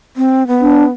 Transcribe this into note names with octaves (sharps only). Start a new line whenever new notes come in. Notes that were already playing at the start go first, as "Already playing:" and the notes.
C4
B3
D4